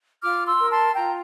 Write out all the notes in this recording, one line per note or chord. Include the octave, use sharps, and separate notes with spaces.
F4 D6 F6
C6 E6
A#4
A5 C6
F4 G5 A#5